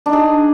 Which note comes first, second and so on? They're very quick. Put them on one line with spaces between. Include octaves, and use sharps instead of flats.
D4 D#4 G#4